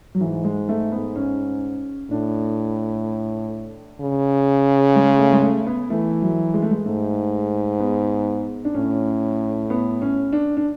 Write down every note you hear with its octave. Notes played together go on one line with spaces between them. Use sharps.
F#3
G#2 E3
G#3
A3
B3
C#4
A2 D4
C#3
G#3
A3
G#3
A3
B3
E3 A3
F#3
G#3
A3
G#3
G#2 A3
B3
D4
A2 C#4
B3
C#4
D4
D4